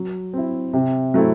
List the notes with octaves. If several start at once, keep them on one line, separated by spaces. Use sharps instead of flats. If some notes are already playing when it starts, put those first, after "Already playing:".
Already playing: F#3
C4 E4
C3
F#3 A3 C4 E4